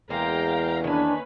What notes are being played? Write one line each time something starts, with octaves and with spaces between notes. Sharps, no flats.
E2 G#3 A#3 F5 G5 A#5
D#3 A#3 C#4 D4 B4 G#5